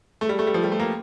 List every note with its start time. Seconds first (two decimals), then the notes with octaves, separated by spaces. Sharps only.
0.21 A3
0.29 G3
0.39 A3
0.47 G3
0.54 F3
0.64 G3
0.72 A3
0.80 A#3